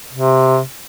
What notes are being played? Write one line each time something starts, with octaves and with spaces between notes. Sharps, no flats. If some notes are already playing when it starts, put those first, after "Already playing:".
C3